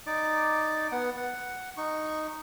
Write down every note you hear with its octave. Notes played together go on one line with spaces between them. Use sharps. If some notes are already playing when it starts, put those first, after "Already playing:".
D#4 D5 D6
B3 F#5
F#5
D#4 C#6